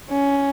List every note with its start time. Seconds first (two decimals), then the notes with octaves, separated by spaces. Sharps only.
0.10 C#4